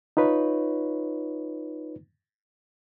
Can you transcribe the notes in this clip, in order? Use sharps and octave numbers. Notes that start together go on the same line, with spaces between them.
D#4 F4 B4 C#5